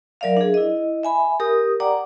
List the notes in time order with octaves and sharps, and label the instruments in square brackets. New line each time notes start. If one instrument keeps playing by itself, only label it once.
[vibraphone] F#3 A#4 D5 E5 F5
D4 G#4
E4 D#5
E5 G#5 B5
G4 A#4 D#6
D5 F#5 G5 A#5 D6